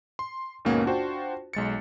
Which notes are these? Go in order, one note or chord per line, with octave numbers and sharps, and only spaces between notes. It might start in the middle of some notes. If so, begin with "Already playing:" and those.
C6
D#2 G#2 B2 A#3 C#4 F#5
D4 F4 F#4 C5 G5 A5
B1 G#3 A6 C#7